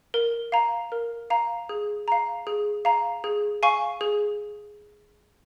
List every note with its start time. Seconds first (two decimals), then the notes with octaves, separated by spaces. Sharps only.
0.14 A#4
0.52 F5 A#5
0.92 A#4
1.30 F5 A#5
1.69 G#4
2.08 F5 A#5
2.47 G#4
2.85 F5 A#5
3.24 G#4
3.63 F5 G#5 C#6
4.01 G#4